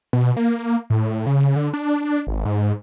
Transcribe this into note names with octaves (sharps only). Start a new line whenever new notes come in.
B2
A#3
A2
C#3
D3
D4
G#1
G#2